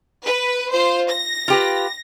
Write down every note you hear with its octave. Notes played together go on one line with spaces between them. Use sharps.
B4
F4 C5
A#6
F4 G4 B4